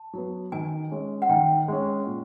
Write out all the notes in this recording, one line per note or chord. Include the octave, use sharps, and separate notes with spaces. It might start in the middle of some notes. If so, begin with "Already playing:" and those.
Already playing: A5
F#3 B3
D#3 G#5
G#3 C#4
F#5
D#3 G5
G#3 C#4
A#2